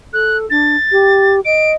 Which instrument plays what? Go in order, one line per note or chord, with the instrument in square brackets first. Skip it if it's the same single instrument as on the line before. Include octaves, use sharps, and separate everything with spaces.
[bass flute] A4 [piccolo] F#6
[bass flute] D4 [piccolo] A6
[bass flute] G4
[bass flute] D#5 [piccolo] D7